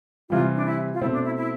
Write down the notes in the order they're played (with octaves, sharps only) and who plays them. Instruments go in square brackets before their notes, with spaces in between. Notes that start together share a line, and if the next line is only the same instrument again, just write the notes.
[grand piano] C3 E3 G3 [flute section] F4
[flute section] D4
E4
F4
[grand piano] B2 A3 C4 [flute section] E4
[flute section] D4
E4
E4